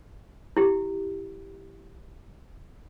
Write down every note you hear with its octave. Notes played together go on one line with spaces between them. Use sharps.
E4 G4